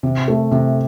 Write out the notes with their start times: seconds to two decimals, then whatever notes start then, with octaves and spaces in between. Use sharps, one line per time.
0.03 C3
0.28 A3
0.52 C3